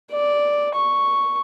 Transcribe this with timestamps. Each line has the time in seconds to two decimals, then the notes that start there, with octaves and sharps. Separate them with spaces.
0.12 D5
0.74 C#6